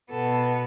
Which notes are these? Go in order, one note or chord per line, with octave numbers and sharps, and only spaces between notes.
B2 B3 A4